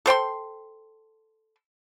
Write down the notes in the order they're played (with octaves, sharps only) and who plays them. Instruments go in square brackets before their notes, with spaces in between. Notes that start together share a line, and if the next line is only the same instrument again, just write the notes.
[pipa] A4 C5 G5 C6